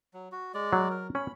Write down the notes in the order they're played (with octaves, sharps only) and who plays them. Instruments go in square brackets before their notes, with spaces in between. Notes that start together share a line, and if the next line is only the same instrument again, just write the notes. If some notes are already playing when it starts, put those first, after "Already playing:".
[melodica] F#3
F#4
G#3 D5
[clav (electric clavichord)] F#3
[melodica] A#4
[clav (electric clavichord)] C#4 [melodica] B5